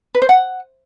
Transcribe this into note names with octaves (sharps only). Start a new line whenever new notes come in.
B4
C5
F#5